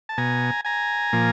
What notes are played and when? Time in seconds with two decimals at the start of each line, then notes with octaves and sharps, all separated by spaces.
0.09 A5
0.18 B2 G#5 A#5
0.65 G#5 A#5
1.13 A#2 F3